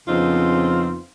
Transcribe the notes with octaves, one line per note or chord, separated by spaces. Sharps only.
F2 C#3 B3 C4 D#4 F4